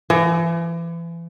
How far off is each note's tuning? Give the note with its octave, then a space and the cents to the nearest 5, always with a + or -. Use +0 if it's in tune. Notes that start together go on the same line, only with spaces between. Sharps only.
E3 +35